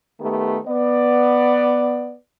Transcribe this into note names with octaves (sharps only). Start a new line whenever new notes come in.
D#3 A3 B3 G4
B3 D5